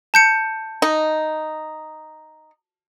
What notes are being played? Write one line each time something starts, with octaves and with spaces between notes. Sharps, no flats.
A5 G6 C#7
D#4